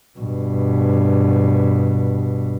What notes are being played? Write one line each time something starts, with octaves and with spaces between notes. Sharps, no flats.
G2 B2